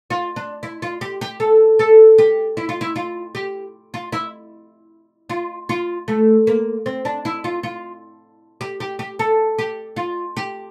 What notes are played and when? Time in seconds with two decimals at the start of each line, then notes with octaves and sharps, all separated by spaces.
0.10 F4
0.36 D4
0.63 E4
0.82 F4
1.01 G4
1.21 G4
1.40 A4
1.79 A4
2.18 G4
2.57 E4
2.69 F4
2.81 E4
2.96 F4
3.35 G4
3.94 F4
4.12 E4
5.29 F4
5.69 F4
6.08 A3
6.47 A#3
6.86 C4
7.05 D4
7.25 E4
7.44 F4
7.63 F4
8.61 G4
8.80 G4
8.99 G4
9.19 A4
9.58 G4
9.96 F4
10.37 G4